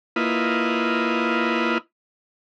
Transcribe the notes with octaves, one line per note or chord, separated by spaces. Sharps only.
A#3 E4 F4 B4 D#5